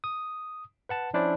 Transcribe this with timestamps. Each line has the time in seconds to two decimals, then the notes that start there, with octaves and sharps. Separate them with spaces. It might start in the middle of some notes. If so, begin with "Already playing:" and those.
0.04 D#6
0.89 B4 F#5 A5
1.14 F3 C#4 D4 E4 C5 D5